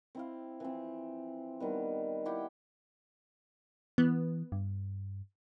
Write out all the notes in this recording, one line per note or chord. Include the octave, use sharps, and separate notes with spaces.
C4 E4 F5
E3 F3 C4
D#3 G3 B3
E4 G4 F#5 G5
E3 B3
G2